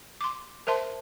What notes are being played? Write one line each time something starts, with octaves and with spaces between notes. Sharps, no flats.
C6 D6
A#4 C5 E5 A5 C6